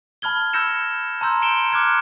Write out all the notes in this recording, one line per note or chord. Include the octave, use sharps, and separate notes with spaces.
A5 B5 F6 G#6 G7
B5 E6 G6 A#6 C#7 E7
A5 A#5 C6 E6 G6
C6 C#7 D7 E7 G7
D6 F6 F#6 G#6 C#7